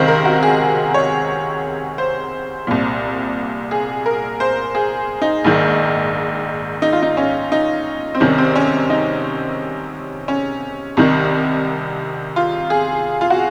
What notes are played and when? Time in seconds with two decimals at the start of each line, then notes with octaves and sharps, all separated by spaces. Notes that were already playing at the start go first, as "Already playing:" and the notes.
Already playing: C#2 C3 D#3 C5
0.08 A#4
0.25 F#4
0.43 G#4
0.94 C#5
1.98 C5
2.67 C2 A#2
3.71 G#4
4.06 A#4
4.40 C5
4.75 G#4
5.22 D#4
5.44 A#1 G#2 D#3
6.82 D#4
6.93 F4
7.02 D#4
7.17 C#4
7.52 D#4
8.15 C4
8.20 C2 C3 D#3 C#4
8.38 C4
8.56 C#4
8.90 D#4
10.28 C#4
10.97 C2 C3 D#3
12.36 F4
12.70 G#4
13.21 F4
13.30 F#4